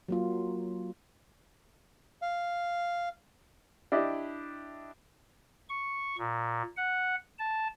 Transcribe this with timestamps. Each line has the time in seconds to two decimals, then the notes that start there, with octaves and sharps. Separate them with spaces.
0.09 F#3 A#3 F4
2.22 F5
3.92 D4 E4 G4 D5 D#5
5.69 C#6
6.18 A#2
6.77 F#5
7.39 A5